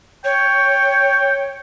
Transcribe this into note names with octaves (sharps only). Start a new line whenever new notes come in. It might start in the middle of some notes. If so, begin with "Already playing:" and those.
C#5 G5